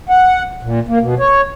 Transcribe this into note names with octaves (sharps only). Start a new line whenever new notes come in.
F#5
A#2
A#3
B2
C#5